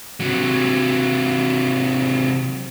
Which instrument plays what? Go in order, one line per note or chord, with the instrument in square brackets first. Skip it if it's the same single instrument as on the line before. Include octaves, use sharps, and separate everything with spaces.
[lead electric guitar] C3 F#3